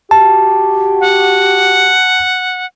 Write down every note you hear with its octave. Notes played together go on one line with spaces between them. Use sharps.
F#4 G4 A5
F#5